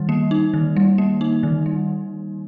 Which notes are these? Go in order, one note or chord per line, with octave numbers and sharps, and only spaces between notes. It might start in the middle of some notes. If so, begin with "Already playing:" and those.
Already playing: D#3 G3
A#3
D#4
D#3
G3
A#3
D#4
D#3
G3